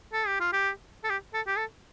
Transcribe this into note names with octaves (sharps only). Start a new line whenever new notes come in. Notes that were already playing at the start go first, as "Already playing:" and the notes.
A4
G4
F4
G4
A4
G4
A4
G4
A4